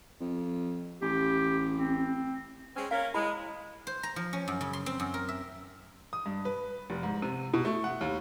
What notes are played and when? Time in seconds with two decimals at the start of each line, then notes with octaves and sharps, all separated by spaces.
0.20 F2
1.02 A1 G4
1.76 C4
2.76 G#3 C4 C#4
2.91 A#3 C#4 A#4 F5
3.14 G#3 E4 B5
3.87 C5
4.03 A#5
4.16 F3
4.33 C#4
4.48 F#2
4.61 C#3
4.73 C6
4.86 C4
5.00 F#2
5.14 A#4
5.29 E5
6.13 D#6
6.26 G2
6.45 B4
6.90 F1
7.03 G#2
7.22 C3
7.54 B2
7.65 A3
7.84 F#5
8.01 D#2